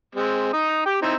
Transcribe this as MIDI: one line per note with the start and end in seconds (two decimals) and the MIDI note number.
0.15 0.53 56
0.15 0.53 60
0.53 0.86 63
0.53 0.86 87
0.86 1.02 67
0.86 1.02 79
1.02 1.15 60
1.02 1.15 63
1.02 1.15 64